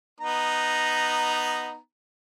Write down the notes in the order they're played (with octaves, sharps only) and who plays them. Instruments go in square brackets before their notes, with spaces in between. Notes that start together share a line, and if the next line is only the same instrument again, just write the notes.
[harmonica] B3 D#4 A#5